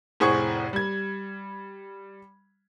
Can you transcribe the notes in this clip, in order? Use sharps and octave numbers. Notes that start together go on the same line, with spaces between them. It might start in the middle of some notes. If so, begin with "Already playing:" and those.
F1 A2 G#4 C5 F#5 C#6
G3 G#6